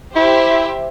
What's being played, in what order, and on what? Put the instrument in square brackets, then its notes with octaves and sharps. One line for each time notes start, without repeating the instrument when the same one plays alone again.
[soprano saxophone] E4 [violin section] G4 C5 E5